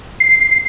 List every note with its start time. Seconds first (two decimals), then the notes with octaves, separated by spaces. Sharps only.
0.20 C7